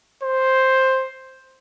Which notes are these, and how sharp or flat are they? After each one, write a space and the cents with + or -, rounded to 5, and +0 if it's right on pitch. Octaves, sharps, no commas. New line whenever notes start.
C5 +5